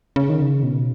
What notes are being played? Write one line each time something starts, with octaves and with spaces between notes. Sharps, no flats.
C#3
D#3
C#3
B2